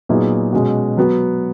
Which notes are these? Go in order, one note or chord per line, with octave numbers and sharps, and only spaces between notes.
A#2 F#3 B3 D#4 G#4
B2 G#3 C#4 F#4
F#3 B3 F#4